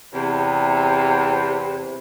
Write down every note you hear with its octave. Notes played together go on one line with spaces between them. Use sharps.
E2 C3